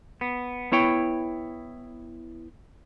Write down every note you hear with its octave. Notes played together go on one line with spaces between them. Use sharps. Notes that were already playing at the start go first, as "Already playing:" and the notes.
B3
B3 E4 C#5 G5